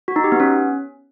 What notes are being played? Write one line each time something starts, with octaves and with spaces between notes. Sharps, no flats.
F#4
D#4
G4
B3
C#4